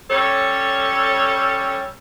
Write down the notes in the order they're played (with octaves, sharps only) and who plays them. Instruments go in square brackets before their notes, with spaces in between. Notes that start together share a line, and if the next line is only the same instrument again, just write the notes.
[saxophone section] G3 C#4 A4 C#5